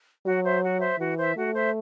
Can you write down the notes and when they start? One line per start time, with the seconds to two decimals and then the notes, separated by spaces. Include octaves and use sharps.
0.25 F#3 F#4
0.44 C5 E5
0.62 F#4
0.81 C5 E5
0.99 E3 F#4
1.17 C5 E5
1.36 A3 F#4
1.55 C5 E5